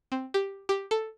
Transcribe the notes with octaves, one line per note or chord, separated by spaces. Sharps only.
C4
G4
G4
A4